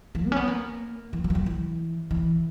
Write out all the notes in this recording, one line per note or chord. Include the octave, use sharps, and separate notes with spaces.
E3
B3
C#4
B3
A#3
E3
F#3
E3
F#3
E3
E3